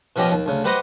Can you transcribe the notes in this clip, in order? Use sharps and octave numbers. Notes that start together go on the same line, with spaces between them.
B2 F3 C#4 G4 D#5
D#2
D2 C#3
F#4 G4 B4 C5 D#5 F#5